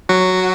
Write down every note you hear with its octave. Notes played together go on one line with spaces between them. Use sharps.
F#3 F#4